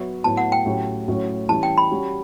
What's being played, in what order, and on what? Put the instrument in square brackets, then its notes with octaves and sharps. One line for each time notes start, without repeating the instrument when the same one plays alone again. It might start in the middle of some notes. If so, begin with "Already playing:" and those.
Already playing: [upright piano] F#3 B3 F#4 C#5 E5
[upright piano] A2 F#3 B3 E4 [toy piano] A5
[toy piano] F#5
G5
[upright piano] A2 F#3 C#4 G4
A2 F#3 C#4 F#4 A4
[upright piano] E3 G3 C#4 E4 [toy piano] A5
[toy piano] G5
B5
[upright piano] G3 C#4 F#4